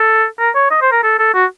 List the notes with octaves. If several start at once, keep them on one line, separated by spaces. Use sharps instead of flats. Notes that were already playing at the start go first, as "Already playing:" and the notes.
Already playing: A4
A#4
C#5
D#5
C5
A#4
A4
A4
F#4